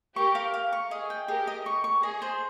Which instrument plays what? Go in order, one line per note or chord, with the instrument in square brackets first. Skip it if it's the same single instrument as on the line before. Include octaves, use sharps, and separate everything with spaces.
[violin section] G4 A#4 [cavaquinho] C#6
[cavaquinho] F5
F5
C#6
[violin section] G#4 [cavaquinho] D#5
[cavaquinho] G5
[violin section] G4 A#4 [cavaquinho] G#4
[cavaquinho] D#5
C#6
C#6
[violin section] G#4 [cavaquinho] D#5
[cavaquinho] C5